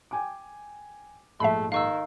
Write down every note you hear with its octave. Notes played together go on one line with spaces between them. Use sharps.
G5 G#5 D6
A#1 G#2 A3 E5 B5 C7
D#3 F5 C#6 E6